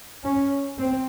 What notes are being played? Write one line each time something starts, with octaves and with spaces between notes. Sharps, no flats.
C#4
C4